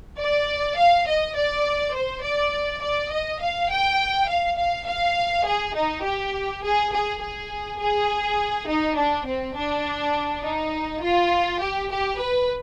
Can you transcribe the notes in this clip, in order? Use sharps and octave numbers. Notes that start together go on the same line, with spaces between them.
D5
F5
D#5
D5
C5
D5
D5
D#5
F5
G5
F5
F5
F5
G#4
D#4
G4
G#4
G#4
G#4
G#4
D#4
D4
C4
D4
D#4
F4
G4
G4
B4